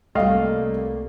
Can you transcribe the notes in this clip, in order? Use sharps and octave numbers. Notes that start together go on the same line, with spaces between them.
C2 G3 A3 A#3 D#5 F5